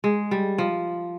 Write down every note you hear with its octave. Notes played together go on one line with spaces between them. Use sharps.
G#3
G3
F3